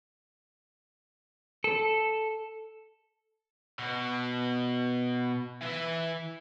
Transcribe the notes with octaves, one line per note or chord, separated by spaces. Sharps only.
A4
B2
E3 E5